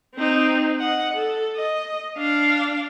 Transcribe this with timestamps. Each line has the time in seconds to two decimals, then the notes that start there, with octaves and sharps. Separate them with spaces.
0.15 C4 D#4
0.80 D#5 F#5
1.13 A4
1.56 D#5
2.18 D4 F5